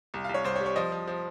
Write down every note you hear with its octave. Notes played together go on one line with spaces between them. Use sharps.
C2
C2 F5
C#5
C2 C5
C#5
G3
C#5
F3 D#5
F3
F3